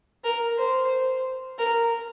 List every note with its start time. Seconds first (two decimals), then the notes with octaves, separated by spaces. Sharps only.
0.24 A#4
0.58 C5
1.58 A#4